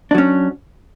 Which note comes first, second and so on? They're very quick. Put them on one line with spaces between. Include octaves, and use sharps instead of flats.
D4 F#3 C#4